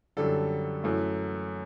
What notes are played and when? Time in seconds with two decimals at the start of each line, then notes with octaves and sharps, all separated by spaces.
0.17 F#2 D3 G3 A4
0.84 F#2 E3 A3